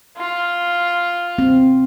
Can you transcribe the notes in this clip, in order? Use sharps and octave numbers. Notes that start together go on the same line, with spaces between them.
F4
C4